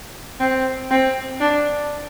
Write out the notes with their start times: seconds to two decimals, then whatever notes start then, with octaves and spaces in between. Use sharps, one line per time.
0.40 C4
0.90 C4
1.40 D4